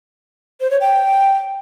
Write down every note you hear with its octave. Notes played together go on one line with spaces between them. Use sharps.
C5
C#5
G5